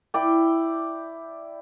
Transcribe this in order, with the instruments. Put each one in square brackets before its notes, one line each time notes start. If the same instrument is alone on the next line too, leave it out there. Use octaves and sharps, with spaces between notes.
[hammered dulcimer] E4 D5 G5